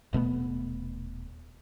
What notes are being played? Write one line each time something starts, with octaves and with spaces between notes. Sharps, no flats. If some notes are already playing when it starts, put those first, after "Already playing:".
D#1 B2 A3 B3